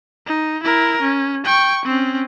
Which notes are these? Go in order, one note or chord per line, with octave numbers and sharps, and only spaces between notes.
D#4
E4 A#4
C#4
G5 C#6
C4 C#4